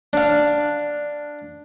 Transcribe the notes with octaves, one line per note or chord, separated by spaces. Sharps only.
D4 F5